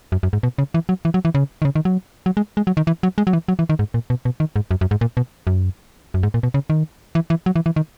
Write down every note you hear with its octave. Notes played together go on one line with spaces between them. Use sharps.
F#2
F#2
G#2
B2
C#3
E3
F#3
E3
F#3
E3
C#3
D#3
C#3
D#3
F#3
F#3
G#3
G#3
F#3
D#3
E3
F#3
G#3
F#3
E3
F#3
E3
D#3
G#2
A#2
B2
B2
D#3
G#2
F#2
F#2
G#2
A#2
B2
F#2
F#2
G#2
A#2
B2
C#3
D#3
E3
E3
F#3
E3
E3
D#3